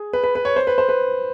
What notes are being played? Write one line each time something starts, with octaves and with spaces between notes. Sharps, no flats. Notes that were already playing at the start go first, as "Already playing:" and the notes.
Already playing: G#4
B4
B4
B4
C#5
C5
B4
C5
B4